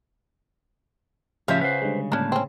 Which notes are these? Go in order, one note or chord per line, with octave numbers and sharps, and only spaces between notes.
A2 C#3 F3 F4 G4 E5 F6
B4 C5 F5 F#5
D3 G3 G#3
A2 A#3 C#4 D4 A5
C4 C#4